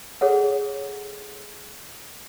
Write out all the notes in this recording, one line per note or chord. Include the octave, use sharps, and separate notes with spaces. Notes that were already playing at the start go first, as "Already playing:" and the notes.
G#4 A4 C#5 F#5